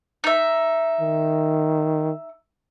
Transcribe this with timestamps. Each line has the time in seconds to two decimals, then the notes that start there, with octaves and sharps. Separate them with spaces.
0.24 D#4 E5
1.01 D#3